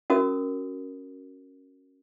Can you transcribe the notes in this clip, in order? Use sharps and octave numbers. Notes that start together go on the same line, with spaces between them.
C#4 F#4 A#4 D#6